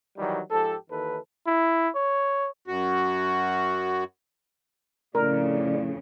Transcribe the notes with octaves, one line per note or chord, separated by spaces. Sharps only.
D#3 E3 F#3 G3
G#2 F3 G4 A4
D#2 D#3 E3 A4 B4
E4
C#5
F#2 F#4
F2 A2 C#3 A#4 D5